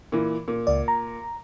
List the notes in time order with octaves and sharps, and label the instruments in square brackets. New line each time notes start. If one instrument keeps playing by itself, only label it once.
[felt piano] A#2 E3
A#2
[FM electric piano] C#2 D5
A#5